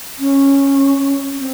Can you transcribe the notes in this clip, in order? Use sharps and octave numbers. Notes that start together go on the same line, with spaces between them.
C#4
C4